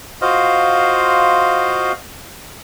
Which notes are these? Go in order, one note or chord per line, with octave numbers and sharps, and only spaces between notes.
F4 F#4 C5 D#5 F5